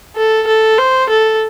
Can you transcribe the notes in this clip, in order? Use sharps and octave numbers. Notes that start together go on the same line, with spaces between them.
A4
A4
C5
A4